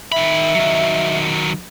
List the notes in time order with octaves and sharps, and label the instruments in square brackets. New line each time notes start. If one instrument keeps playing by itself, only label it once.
[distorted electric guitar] D#3 B5 [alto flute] E5
[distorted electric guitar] D#3 F#3